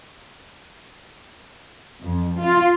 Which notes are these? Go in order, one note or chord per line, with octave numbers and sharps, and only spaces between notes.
F2
F4